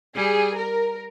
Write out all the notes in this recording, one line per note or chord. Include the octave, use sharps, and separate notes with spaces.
G3 G#4
A#4